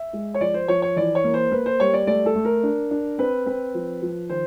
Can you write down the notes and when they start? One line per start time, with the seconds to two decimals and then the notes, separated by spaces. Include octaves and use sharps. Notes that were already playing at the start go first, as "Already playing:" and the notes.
Already playing: E5
0.13 G#3
0.34 C#5
0.41 F3 D5
0.54 C5
0.68 F3 C#5
0.82 C#5
0.96 E3 D5
1.15 C#5
1.24 A#3
1.34 C5
1.52 A#3 B4
1.66 C5
1.80 G3 C#5
1.94 D5
2.07 A3 D5
2.26 A4
2.35 A3
2.45 A#4
2.63 D4
2.91 D4
3.18 C4 B4
3.46 C4 B4
3.74 F3
4.02 F3
4.30 D#3 C5